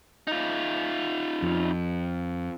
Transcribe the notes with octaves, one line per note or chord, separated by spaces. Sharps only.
D#4 F4
F2